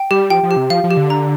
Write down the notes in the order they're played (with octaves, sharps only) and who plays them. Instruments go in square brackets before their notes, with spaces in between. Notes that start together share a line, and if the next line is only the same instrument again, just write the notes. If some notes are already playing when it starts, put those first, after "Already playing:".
Already playing: [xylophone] G5
[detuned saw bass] G3 [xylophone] G4
[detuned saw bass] F3 [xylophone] G5
[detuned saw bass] F3
[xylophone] G4
[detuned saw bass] C3
[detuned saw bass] F3 [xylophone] F5
[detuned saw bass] F3
[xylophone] G4
[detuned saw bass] D3
[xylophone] A#5